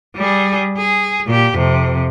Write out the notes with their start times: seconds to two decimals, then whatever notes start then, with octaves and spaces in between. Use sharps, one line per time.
0.17 G3 G#4
0.77 G#4
1.27 A#2 G4
1.56 F2 C3